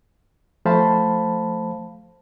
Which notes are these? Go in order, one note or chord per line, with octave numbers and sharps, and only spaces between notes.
F3 A3 C5 F5 A5 B5